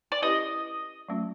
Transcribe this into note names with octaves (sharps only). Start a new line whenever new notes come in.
D5
C#4 E4 G4 B4 D#5
F#3 A3 C#4 F4